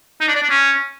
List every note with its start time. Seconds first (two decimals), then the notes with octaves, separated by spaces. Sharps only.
0.21 D#4
0.28 D4
0.35 D5
0.43 D4
0.50 C#4